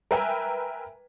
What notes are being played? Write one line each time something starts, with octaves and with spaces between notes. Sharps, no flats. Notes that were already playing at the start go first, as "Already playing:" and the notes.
A#4 B4 E5 G5 G#5 A#5